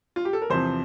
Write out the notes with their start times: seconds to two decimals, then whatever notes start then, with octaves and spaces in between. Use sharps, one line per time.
0.16 F4
0.25 G4
0.33 A4
0.42 A#4
0.50 E2 C3 F3 C5